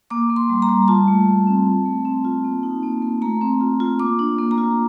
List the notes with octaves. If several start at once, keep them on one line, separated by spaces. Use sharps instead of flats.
A#3 D6
A#3
C6
G3
A#5
G3
F4 A5
A3
A3
C4
C4
A3
C4
F4
A#3
D#4
A#3
A#3
A3 A#5
C4
F4
F4
A#3 D6
D4
A#3
A#5
F4